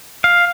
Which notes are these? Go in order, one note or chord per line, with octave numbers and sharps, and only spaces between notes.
F5